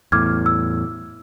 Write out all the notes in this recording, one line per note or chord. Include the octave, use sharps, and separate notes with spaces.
E2 A2 D6 F6 G#6
E6